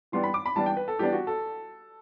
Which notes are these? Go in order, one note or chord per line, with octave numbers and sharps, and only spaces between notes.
E3 G3 B3 D4 C6
B5
D6
B5
E3 G3 B3 D4 A5
G5
B4
A4
E3 G3 B3 D4 G4
F#4
A4